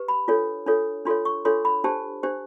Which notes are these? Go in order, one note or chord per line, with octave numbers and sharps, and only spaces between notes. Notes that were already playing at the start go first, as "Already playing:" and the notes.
Already playing: G4 B4
B5
D4 F4 A4 C#5
D4 F4 A4 C#5
D4 F4 A4 C#5 C6
C#6
D4 F4 A4 C#5 C6
B5
D4 G4 C5 A5
D4 G4 C5